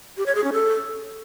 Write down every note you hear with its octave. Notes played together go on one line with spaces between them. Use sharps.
G4
C#5
G#4
C#4
A4